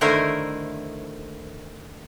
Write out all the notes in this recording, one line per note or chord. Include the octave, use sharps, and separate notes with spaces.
D3 D#3 A3 E4 A#4 C5